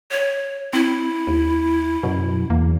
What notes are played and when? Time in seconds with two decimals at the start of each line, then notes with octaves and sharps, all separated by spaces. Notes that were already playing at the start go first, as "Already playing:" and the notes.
0.11 C#5
0.73 C4 E4
1.27 D#2
2.03 F#2 B2
2.50 E2 A#3